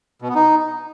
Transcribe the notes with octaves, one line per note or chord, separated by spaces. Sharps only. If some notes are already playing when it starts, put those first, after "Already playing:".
B2
B3
D#4